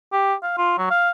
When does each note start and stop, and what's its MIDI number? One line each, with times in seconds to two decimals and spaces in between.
0.13 0.34 67
0.43 0.56 77
0.58 0.74 65
0.78 0.86 54
0.91 1.10 77